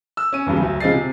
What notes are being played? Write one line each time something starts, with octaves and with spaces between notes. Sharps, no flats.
E6
C#4 D#7
E2 G2 C#3 F#3
D2 F#3
C#3 F3 G#3 D#5 A6 C7
C3